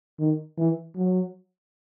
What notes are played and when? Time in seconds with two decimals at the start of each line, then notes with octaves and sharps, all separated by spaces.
0.19 D#3
0.58 E3
0.96 F#3